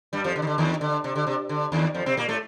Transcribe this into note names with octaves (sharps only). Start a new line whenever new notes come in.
G2 G3
F2 F3
D3
D#3
D3
D#2 D#3
D3
C3
D3
C3
D3
D#2 D#3
F2 F3
C3 C4
A#2 A#3
A2 A3